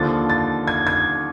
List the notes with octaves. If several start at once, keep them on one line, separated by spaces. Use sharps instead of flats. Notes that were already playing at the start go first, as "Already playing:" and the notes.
Already playing: D#2 D3 F3 A6
A6
G#6
G#6